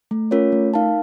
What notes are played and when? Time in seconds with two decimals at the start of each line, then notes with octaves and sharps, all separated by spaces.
0.11 A3
0.31 C#4 F4 A#4 C#5
0.52 A3
0.74 D#4 A#4 F5 A5